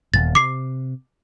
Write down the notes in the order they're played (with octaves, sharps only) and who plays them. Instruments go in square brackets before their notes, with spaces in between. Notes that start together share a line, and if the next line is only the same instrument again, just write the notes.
[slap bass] D#1 E2 [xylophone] A6
[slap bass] C3 [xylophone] D6 C7